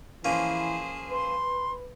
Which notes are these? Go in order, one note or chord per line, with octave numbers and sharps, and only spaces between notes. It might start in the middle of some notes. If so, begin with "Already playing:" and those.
E3 F3 A#3 C#4 G#4 C5
B4 C6